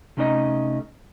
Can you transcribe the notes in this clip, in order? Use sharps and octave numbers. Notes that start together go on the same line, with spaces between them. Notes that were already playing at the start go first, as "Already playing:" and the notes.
C3 A3 C#4 D#4 C5 D#5